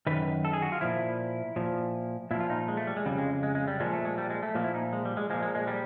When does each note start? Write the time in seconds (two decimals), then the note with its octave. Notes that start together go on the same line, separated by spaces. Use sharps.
0.07 F#2 D#3 B4
0.45 A4
0.53 G#4
0.62 F#4
0.72 F4
0.81 A#2 F3 E4
1.56 A#2 F3
2.31 A#2 F3 E4
2.40 F4
2.50 D#4
2.68 G#3
2.77 A3
2.87 G3
2.97 G#3
3.06 F2 C#3 G3
3.18 G#3
3.43 G#3
3.55 G#3
3.68 G3
3.80 A#2 F3 G#3
3.93 A3
4.05 G#3
4.18 G3
4.30 G#3
4.43 A3
4.55 A#2 F3 A#3
4.64 E4
4.74 D#4
4.93 G#3
5.05 G3
5.17 G#3
5.30 F3 G#3
5.34 A#2
5.43 G#3
5.55 G#3
5.67 G3